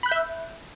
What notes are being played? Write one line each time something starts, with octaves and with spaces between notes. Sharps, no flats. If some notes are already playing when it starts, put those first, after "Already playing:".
E5 B5 F#6 G6